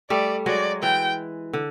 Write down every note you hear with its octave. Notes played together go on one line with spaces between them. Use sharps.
G3 A3 D5
F#3 G#3 D5
E3 G5
D3